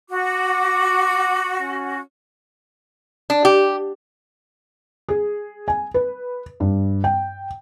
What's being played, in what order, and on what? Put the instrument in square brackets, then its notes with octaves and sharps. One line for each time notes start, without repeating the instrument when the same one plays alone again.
[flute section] F#4 [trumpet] D6
[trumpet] C#4
[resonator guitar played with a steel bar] D4
G4
[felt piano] G#4
G#5
B4
G2
G5